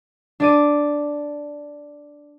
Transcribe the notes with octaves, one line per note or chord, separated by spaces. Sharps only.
D4 D5 D#7